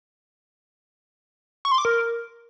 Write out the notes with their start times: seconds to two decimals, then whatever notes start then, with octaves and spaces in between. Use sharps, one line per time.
1.65 C#6
1.72 C6
1.78 D6
1.85 A#4